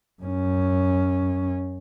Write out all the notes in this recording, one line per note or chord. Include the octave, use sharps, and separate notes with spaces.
F#2 C#4